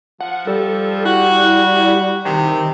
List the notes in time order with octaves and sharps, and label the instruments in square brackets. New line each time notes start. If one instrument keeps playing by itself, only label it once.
[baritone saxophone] F3 [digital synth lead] F#5
[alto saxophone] G3 [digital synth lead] A4
[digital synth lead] E4 [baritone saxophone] F#4
[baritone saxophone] C3 [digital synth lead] D#3